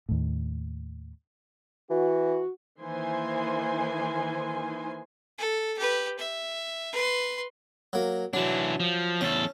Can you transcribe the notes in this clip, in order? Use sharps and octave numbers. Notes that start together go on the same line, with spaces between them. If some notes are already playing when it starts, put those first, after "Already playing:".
D#2 A2
E3 F#4
D#3 E3 A#3 C5 G#5 C6
A4
G4 B4
E5
B4 C6
F#3 A#3
E3 F#3 D4
F3
E2 C#4 A4